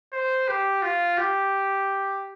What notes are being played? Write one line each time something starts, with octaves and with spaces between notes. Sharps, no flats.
C5
G4
F4
G4